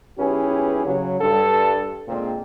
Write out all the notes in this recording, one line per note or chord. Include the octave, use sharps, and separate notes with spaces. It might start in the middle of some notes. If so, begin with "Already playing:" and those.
B1 C#4 E4 G4 G#4 B4
C#3 F#3
G2 A4
A#2 D3 G#3 A#3 C4